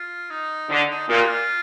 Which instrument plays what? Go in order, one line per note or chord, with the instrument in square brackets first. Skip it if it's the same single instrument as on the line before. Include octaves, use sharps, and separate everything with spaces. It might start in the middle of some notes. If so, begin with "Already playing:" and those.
Already playing: [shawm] F4
D#4
[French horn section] D3
[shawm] D#4
[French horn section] A#2 [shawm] D#4
[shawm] G4
F4